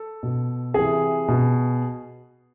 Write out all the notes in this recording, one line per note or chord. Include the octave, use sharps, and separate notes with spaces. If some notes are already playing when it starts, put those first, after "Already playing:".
Already playing: A4
B2
C3 E3 G#4
B2